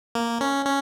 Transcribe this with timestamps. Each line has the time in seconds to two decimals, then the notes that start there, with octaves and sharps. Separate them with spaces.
0.15 A#3
0.41 C#4
0.65 C#4